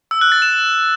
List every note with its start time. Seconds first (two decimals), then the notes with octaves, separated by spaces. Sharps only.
0.11 E6
0.21 F#6
0.32 A6
0.42 E7